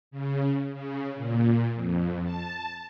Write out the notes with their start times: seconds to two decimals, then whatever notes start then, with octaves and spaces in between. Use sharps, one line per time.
0.11 C#3
0.74 C#3
1.16 A#2
1.75 F2
2.24 A5